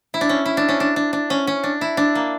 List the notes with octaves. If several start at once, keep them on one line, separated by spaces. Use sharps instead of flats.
E4
D4
C#4
E4
D4
C#4
D4
D4
D4
C#4
C#4
D4
E4
D4
A#3